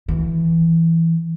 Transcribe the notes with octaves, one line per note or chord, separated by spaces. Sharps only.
E3